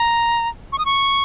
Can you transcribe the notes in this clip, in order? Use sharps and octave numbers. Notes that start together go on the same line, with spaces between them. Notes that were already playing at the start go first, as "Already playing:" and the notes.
Already playing: A#5
C#6
D#6
C#6